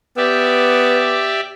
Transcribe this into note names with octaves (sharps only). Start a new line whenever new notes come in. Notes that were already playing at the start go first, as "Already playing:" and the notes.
B3 G4 D5 E5